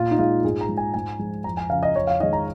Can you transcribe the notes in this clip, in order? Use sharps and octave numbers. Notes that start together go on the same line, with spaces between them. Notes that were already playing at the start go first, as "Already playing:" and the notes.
Already playing: A#2 F4
D#4
G#3 F4
G#2 G#4
A#5
G#3
G#5
G#2 G#5
F3 G#3
F2 A#5
G#5
C#3 F3 F5
D#5
F2 C#5
F5
D#3 G#3 D#5
A#5